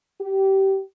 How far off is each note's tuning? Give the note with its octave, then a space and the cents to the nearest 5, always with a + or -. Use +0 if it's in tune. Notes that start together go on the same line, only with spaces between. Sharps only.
G4 -20